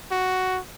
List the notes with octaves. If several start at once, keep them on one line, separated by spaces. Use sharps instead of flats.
F#4